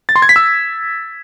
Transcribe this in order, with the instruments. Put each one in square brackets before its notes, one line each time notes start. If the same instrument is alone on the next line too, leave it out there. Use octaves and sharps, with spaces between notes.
[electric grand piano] A6
C6
G#6
B6
E6